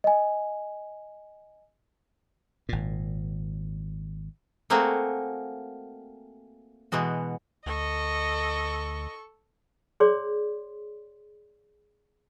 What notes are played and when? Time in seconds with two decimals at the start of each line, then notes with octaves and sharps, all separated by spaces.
0.04 D#5 G#5
2.69 G#1 A#2
4.70 A3 A#3 C4 F#4 G#4
6.92 B2 E3 G#3 F#4
7.66 D2 A4 D#5 C#6
10.00 G#4 C#5 D5 C6